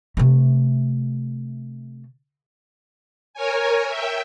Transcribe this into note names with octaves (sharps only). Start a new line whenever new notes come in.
C3 A3
A#4 C#5 G#5
E5 G5